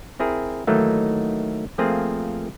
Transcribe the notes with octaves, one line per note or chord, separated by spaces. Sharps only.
C4 E4 G#4 A#4
D#3 E3 F#3 A3 A#3 D#4
F3 A3 A#3 C4 F4 G#4